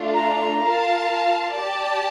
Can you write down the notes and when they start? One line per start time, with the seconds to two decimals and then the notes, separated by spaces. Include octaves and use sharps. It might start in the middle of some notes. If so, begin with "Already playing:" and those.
Already playing: A3 D4 F4
0.14 A#5
0.61 F4 A#4 F5 A5
1.53 G4 D5 A5